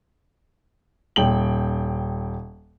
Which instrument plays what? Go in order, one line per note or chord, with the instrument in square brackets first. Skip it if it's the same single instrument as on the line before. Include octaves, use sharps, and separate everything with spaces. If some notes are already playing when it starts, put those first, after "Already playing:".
[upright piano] D#1 G5 F#7